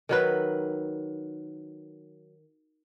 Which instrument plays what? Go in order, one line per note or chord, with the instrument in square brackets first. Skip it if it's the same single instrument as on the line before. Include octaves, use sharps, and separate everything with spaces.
[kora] D#3 F#3 B4